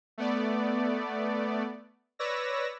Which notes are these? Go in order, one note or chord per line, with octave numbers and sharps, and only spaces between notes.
A3 B3 D5
B4 C#5 D5 E6 A#6